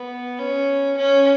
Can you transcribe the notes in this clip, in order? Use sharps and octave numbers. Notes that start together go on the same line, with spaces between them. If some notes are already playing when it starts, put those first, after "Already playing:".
Already playing: B3
C#4
C#4